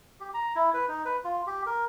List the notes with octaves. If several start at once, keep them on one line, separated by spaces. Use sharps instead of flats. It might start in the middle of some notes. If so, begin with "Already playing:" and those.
G4
A#5
E4
B4
D#4
B4
F4
G4
A#4